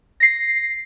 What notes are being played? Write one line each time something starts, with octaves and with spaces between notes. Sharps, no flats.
A#6 C7